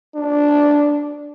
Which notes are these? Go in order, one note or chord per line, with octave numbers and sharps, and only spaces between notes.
D4